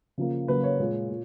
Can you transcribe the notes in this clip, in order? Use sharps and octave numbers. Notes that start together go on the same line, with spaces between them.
C#3 F3 A#3
C#3 F#3 A#3 B4
C#5
A#2 G#3
A#2